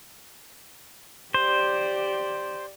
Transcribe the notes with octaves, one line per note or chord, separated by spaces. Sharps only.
G4 C5 D5